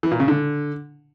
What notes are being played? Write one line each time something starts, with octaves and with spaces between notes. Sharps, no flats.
E3
A#2
C#3
D3